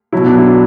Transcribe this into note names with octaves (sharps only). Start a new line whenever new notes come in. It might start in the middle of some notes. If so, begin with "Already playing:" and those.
B2 F#3 E4
D4
E4